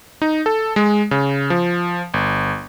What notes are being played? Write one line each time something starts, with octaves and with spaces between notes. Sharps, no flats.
D#4
A4
G#3
C#3
F3
G1